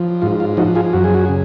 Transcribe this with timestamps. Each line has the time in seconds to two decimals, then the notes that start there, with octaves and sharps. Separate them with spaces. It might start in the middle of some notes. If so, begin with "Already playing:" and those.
Already playing: F3
0.22 G#2 F4
0.40 F4
0.57 F3 D#4 F#4
0.75 F4 G#4
0.93 F#2 F#4
1.04 G#4
1.14 F#4
1.25 C#3 G#4